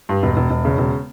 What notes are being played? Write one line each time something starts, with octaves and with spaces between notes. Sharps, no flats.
G2
E1
E1
E1
C#3
E1